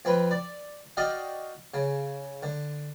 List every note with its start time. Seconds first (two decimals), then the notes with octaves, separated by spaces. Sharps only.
0.05 F2 C4 B4
0.31 D5
0.97 F#4 D5 D#5 F5 G5
1.74 C#3
2.43 D3